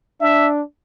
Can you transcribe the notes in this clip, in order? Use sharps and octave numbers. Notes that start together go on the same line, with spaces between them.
D4 E5